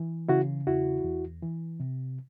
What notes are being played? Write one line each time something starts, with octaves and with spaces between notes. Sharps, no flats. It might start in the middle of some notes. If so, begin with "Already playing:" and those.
Already playing: E3
C#3 E4 F#4
E2 E4 F#4
E2
E3
C3